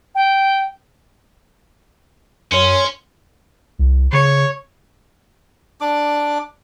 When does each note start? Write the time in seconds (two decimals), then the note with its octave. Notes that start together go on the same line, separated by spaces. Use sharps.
0.15 G5
2.52 F#2 C#4 C#5 C6 C#7
3.79 C2
4.12 C#3 C#5
5.81 D4 D6